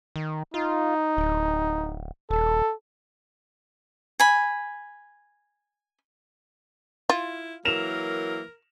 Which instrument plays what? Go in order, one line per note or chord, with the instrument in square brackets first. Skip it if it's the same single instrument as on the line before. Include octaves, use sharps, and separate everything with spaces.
[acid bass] D#3
[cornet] D#4 [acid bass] F4
[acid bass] D1
[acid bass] D#1 [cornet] A4
[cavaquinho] G#5 B5
[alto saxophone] E4 [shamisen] F4
[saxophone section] E3 F#3 A#3 [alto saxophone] A#4 [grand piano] E7 F7